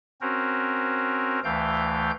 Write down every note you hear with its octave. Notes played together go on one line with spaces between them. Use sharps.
C4 C#4 F#4 A#4 C5
D2 E3 A3 F5 G5 G6